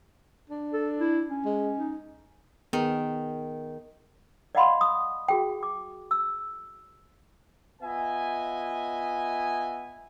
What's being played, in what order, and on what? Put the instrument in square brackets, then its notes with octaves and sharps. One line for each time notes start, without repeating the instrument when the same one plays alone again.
[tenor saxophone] D4
[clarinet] A4
E4
C#4
[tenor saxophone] G#3
D#4
[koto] D#3 [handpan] B3 G#4
[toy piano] D5 D#5 F5 F#5 B5 C6
D#6
F#4 G#4 G5
D6
E6
[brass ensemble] B3 F4 D#5 E5 G#5